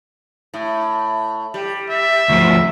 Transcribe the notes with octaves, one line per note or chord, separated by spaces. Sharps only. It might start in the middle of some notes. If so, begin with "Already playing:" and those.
A2
G3
E5
D2 F3